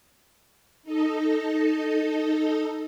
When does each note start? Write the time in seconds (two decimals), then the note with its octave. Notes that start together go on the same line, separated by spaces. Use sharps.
0.83 D#4 A4 D#5